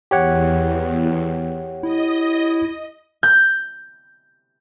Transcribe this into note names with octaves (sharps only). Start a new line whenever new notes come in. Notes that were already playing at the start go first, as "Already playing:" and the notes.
E2 G4 C#5 F#5
E4 D#5
G6